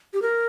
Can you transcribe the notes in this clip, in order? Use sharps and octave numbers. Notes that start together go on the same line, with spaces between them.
G4
A#4